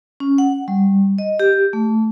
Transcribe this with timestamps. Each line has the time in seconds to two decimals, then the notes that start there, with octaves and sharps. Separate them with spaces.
0.20 C#4
0.38 F#5
0.68 G3
1.19 D#5
1.39 G4
1.73 A3